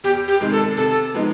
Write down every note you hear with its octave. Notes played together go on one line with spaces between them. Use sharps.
E2 G4
G4
C3 D#3 G#3
A4
C3 A4
F3 G#3 B3 D#4